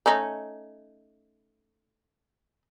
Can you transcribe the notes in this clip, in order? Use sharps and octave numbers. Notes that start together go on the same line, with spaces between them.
A3 C#4 D#4